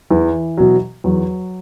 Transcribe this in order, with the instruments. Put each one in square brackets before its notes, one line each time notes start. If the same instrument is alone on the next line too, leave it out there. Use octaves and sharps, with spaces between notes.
[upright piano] E2 [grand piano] E3
[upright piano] B2 F#3
[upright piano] E2 [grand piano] F#3